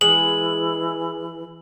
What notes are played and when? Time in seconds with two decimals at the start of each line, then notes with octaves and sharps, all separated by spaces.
0.01 E3 G#3 F#7